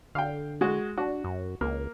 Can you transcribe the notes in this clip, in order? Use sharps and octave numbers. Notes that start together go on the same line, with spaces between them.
D3 F5 G5
G#3 F#4
D4 F#4
F#2
C#2 A#3